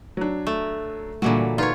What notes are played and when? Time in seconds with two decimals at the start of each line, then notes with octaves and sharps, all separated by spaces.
0.17 F#3 D4
0.47 A3
1.22 A#2 D3 E3 F#3 G3 F#4
1.58 D#4 F4 B4 C#5